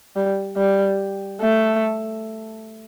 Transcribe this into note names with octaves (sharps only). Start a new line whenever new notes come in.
G3
G3
A3